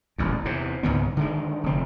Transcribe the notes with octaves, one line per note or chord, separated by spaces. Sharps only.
D#1 A1 E2
E2 C3
C#2 G#2 D#3 B3
D3 D#3 G#3
F1 C4